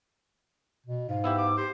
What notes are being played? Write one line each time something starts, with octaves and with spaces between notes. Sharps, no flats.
B2
G#2 F5
B3 E4 G4 E6
D6
G4 C5